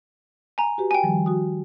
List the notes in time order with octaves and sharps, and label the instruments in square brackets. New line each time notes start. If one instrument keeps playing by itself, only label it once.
[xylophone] G#5 A#5
[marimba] F#4 G4 B4
[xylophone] G5 G#5
[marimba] D#3 F3 G3
F3 F#4 D#6